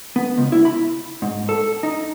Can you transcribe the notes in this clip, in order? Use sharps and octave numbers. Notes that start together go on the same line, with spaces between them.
B3
C#2
E4
B5
G#2
A4
D#4